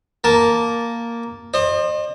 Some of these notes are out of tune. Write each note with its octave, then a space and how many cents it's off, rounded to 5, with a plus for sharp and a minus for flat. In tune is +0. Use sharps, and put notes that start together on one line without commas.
A#3 +0 A5 -5
C5 +30 D#5 -40